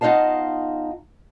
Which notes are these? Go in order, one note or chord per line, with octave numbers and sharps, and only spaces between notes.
B3 D#4 F4 D#5 F5 A5